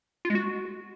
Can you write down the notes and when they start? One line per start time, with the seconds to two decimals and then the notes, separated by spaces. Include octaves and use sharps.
0.25 F4
0.30 G#3
0.35 F#4